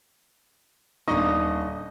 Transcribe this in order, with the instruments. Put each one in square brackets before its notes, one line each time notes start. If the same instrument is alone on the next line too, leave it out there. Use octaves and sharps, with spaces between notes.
[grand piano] D#1 D4 C#6 [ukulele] D#4 [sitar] D#5